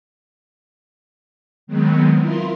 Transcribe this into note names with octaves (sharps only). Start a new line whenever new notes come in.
D#3 F#3 G#3 B3 C4
E4 F4 A#4 C6